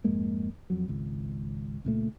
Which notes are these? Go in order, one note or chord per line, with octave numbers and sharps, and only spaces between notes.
F2 G#2 G#3 A#3
F2 F#3
G#1 C#2
C#2 A#2 A3